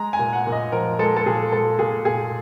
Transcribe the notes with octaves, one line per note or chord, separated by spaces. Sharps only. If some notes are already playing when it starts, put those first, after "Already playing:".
Already playing: G#3 A#5
G#5
A#2
F#5
A#2
D#5
F3 A#4
G#3 A4
A4
A#2 G#4
G#3 A4
A#2 G#4
A#2 G#4